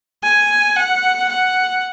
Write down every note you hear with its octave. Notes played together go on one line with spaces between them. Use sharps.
G#5
F#5
F#5